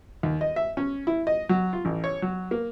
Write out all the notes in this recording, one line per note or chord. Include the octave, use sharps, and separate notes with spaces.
D#2
D#5
E5
C#4
E4
D#5
F#3
F4
A1
C#5
F#3
A#3